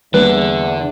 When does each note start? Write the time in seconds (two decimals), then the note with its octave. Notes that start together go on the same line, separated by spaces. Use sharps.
0.14 E2 D3 G3 A#3 A#4 B4